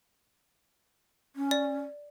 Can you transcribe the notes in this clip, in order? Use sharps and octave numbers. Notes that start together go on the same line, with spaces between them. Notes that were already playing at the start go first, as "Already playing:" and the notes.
C#4
D5